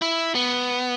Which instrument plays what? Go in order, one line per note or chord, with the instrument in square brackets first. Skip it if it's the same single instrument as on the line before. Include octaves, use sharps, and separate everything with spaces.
[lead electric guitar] E4
B3